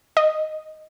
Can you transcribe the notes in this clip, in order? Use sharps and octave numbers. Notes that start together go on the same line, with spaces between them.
D#5